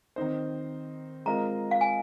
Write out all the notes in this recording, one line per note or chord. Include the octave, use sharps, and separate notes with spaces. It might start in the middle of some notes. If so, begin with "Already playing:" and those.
D#3 C4 D#4 C5
G#3 C4 F4 A#4 D#5 A#5
F5
G#5